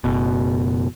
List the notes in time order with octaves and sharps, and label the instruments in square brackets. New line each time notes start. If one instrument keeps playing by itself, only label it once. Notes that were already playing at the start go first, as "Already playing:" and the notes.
[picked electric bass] F#1 B2